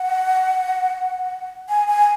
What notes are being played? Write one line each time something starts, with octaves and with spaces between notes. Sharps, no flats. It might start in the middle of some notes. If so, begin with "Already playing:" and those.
Already playing: F#5
G#5
G#5